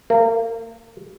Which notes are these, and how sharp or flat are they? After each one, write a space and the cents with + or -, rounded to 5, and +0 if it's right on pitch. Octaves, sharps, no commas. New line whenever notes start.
A#3 -30